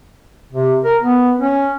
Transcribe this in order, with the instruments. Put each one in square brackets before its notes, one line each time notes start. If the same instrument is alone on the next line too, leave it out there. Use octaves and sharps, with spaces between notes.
[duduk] C3
A#4
B3
C#4